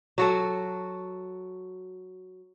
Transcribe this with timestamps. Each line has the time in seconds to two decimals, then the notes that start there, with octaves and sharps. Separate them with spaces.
0.18 F#3 F#4 A4